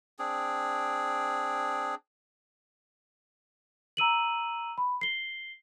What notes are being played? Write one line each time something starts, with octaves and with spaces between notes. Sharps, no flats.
C4 D4 G#4
A#5 E6 D#7 F#7
B5
C7 G7